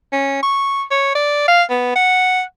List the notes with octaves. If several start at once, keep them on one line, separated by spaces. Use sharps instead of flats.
C#4
C#6
C#5
D5
F5
B3
F#5